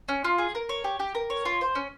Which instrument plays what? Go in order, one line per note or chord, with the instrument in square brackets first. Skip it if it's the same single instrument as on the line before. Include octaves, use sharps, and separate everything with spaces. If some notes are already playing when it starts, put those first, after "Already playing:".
[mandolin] C#4
F4
G#4
A#4
C#5
G4
G4
A#4
C#5
F4
C5
C#4